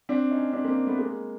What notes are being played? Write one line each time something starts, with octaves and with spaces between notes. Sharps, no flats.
C4 D4
C#4 D#4
C4 D4
A#3 C4
A3 B3
G#3 A#3